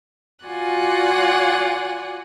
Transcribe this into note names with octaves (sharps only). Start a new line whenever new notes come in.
F4 F#4 D5 F#5 G#5